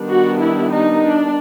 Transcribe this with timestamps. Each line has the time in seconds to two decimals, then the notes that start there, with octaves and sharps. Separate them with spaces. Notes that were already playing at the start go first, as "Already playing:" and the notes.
Already playing: D#3 G3 B3 D4
0.10 F#4
0.41 E4
0.71 D#4
1.02 D4